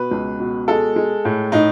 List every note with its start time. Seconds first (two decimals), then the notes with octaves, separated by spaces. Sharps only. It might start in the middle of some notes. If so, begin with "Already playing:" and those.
Already playing: B2 B4
0.11 C#2
0.40 B2
0.68 G#3 A4
0.96 G#3
1.25 A2
1.52 A2 D#4